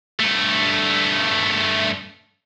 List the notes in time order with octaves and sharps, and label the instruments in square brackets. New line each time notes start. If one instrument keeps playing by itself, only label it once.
[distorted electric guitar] G2 A3